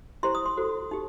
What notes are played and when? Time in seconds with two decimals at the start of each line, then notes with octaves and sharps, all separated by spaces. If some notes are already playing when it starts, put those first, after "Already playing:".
0.23 E4 G4 C5 C6
0.35 D#6
0.46 C6
0.57 F#4 A4 C5
0.91 D#4 G4